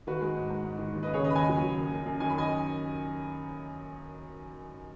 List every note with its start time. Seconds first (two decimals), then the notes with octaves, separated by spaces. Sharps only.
0.07 D#3 F#4 B4
0.21 G#3
0.36 G#2
0.50 G#2
0.64 G#2
0.78 D#3
0.93 D#2
1.03 C#3 B4 D#5
1.14 G#4 C#5
1.21 D#2 B4 D#5
1.30 B5
1.35 D#2 D#5 G#5
1.49 F#3
1.63 D#2
1.77 F#2
1.92 F#2
2.06 F#2
2.20 D#3 G#5
2.30 B5
2.35 F#2 D#5 G#5